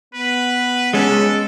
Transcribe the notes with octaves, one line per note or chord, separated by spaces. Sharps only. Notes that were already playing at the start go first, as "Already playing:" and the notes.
B3 B4
G#3 C#4 A4